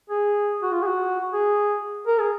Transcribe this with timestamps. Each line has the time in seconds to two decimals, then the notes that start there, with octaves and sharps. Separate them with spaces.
0.10 G#4
0.63 F#4
0.72 F4
0.82 G#4
0.87 F#4
1.33 G#4
2.07 A#4
2.20 G#4